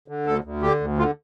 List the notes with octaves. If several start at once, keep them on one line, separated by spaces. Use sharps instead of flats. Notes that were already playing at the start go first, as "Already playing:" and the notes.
D3
D2 A4
D2
D3 G4
D2
D3 F4